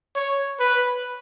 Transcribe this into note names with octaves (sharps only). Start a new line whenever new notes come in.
C#5
B4